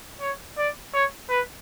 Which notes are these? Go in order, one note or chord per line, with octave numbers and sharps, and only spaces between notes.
C#5
D5
C#5
B4